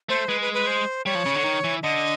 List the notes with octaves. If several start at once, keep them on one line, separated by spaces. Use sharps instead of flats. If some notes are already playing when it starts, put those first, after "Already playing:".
A3 C5
G#3 B4
B4
B4
C5
G3 C#5
F3
C#3
D3
D#3
E3
D3 D#5